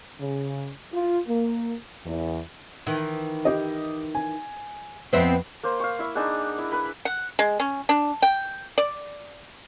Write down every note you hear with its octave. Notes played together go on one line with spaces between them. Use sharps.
C#3
F4
A#3
E2
D#3 E3
G4 D#5
G#5
F2 B3 C4 B4 E5
A#3 C5
F5 C#6
E4 E5
D4 D#4 G#4 F#5
E4
B4 B5
F#5
G#3
C#4
D4
G5
D5